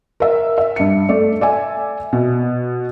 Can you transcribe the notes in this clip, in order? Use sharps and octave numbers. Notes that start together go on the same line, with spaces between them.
A#4 E5
E5
G2 C#7
A3 D5
D5 E5 G#5
B2